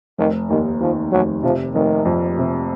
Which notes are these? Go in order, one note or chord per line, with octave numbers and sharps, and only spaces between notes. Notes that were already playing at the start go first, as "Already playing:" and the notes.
F1 D#3
D#2 D#3
D#3 F3
F1 F#3
C3 F3
F1 D#3
F2
C3